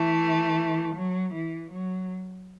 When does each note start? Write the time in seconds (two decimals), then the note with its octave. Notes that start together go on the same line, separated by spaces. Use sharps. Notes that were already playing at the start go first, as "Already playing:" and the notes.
Already playing: E3 A3
0.94 F#3
1.33 E3
1.71 F#3